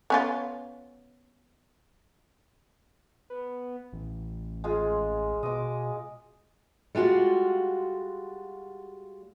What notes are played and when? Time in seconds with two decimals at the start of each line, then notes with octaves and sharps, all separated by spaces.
0.10 B3 C#4 F4
3.30 B3
3.93 A1
4.64 G#3 F4 G#4
5.43 B2 D#5 D6
6.95 G3 G#3 F4 F#4